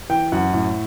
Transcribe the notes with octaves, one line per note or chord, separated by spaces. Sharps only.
E3 G5
F#2 F#5
A2